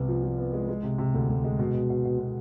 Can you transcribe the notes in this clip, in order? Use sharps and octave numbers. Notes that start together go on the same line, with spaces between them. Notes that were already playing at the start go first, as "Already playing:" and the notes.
Already playing: C2 C3 B3
F3
F3
B3
G#3
G#3
C3
C3
D2
D2
G#3
B2
B2
B2
B2
B2